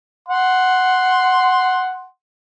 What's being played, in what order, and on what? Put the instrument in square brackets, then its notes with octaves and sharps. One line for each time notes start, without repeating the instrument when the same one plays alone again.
[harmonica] F#5 C6